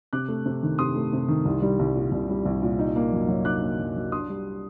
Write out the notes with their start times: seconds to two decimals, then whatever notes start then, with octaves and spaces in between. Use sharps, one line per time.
0.13 C3 D6 F#6
0.28 A3
0.46 C3
0.63 D#3
0.78 C3 C6 D#6
0.96 A3
1.13 C3
1.28 D#3
1.45 C2
1.62 G3
1.79 C2
1.95 A#2
2.12 C2
2.29 G3
2.45 C2
2.62 A#2
2.79 D#4
2.96 A#3
3.13 F#2
3.28 F#3
3.45 D#4 D6 F#6
3.62 A#3
3.79 F#2
3.96 F#3
4.12 D4 C6 D#6
4.29 G3